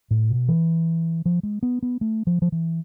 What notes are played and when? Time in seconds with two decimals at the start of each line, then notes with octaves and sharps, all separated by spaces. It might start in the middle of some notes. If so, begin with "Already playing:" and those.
0.11 A2
0.30 B2
0.48 E3
1.26 F3
1.43 G#3
1.63 B3
1.83 B3
2.01 A3
2.27 F3
2.42 F3
2.52 E3